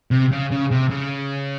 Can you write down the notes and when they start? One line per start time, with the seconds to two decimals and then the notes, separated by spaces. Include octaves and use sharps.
0.11 C3
0.32 C#3
0.51 C#3
0.71 C3
0.91 C#3